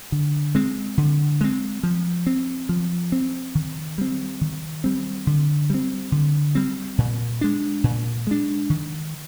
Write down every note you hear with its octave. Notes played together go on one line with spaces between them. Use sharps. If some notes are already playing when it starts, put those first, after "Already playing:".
D3
G#3 C4
D3
G#3 C4
F3
C4
F3
C4
D#3
G3 C4
D#3
G3 C4
D3
G3 C4
D3
G3 C4
A#2
G#3 D4
A#2
G#3 D4
D#3